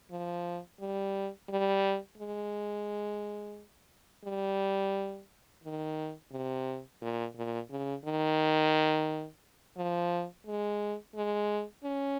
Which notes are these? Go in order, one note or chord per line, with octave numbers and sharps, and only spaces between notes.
F3
G3
G3
G#3
G3
D#3
C3
A#2
A#2
C#3
D#3
F3
G#3
G#3
C#4